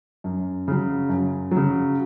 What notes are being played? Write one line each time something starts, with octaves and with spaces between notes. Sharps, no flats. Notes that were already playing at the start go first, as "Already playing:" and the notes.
F#2
C#3 F#3
F#2
F#3
C#3